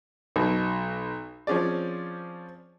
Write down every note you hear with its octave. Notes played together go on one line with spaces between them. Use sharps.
B1 B2
F3 C4 C#4 G#4 D5